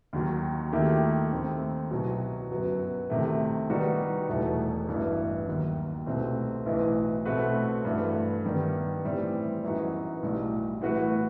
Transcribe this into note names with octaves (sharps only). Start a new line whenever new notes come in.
D#2 D#3 F#3
D#2 D#3 A3 E4 G4
D#2 D#3 A3 C4
C2 B2 F#3
G1 F#2 F#3 B3
C2 C3 D#3 A3
D#3 G3 B3 D#4 F#4
E1 E2 B2 A3
A1 G2 E3 B3 E4
D#2 D#3 F#3
C2 B2 A3 C4
B1 A2 E3 B3
B2 A3 C4 F#4 B4
G2 E3 A3
G1 G2 D#3 G3 B3
A2 E3 G3 C4 E4
F#2 E3 B3 D#4 F#4
B1 A2 G3
A2 E3 B3 F#4 B4